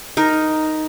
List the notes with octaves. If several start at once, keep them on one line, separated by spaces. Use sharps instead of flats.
D#4 A#4